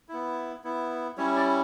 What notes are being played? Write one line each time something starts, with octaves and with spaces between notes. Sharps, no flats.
B3 E4
B3 E4
G3 C#4 E4 C#5
D5